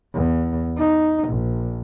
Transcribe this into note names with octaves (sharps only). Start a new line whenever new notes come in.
E2
D#4
A#1